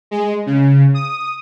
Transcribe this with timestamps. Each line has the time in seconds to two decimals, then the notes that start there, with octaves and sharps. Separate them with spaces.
0.11 G#3
0.46 C#3
0.94 D#6